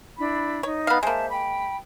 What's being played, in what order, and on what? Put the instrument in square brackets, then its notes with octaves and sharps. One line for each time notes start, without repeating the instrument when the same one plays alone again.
[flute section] D4 E4 B5
[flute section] D#4 [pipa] C#5
[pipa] B3 F5
[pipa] G#3 A#3 [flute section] C5 E5 A5
[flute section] G5 B5